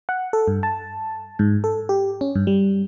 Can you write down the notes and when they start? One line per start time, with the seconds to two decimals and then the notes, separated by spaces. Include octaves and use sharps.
0.09 F#5
0.33 A4
0.48 G2
0.63 A5
1.39 G#2
1.64 A4
1.89 G4
2.21 C#4
2.35 G2
2.47 G3